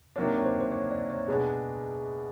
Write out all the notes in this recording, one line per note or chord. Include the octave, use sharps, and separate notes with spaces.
C3 D#3 F#3 A#3 D4 C#5
C#5
C5
C5
C#5
D5
C#5
B2 G#3 B3 D4 G#4